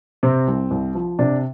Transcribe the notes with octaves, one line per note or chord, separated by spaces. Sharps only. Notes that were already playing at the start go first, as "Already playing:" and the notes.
C3 C4
C2
C2
F3
C3 D4